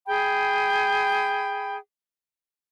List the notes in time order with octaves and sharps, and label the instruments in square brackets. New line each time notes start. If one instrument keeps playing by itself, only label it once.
[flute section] G#4 G5 B5